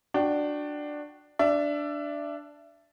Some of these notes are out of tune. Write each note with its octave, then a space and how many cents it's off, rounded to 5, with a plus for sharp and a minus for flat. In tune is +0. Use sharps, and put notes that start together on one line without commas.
D4 +10 F#4 -10 G5 -25
D4 +0 E5 +25